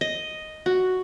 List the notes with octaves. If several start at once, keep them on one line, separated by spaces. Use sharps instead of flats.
D#5
F#4